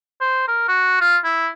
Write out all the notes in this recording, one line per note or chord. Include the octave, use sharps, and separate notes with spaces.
C5
A#4
F#4
F4
E4